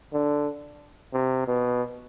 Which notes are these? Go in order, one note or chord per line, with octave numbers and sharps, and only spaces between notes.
D3
C3
B2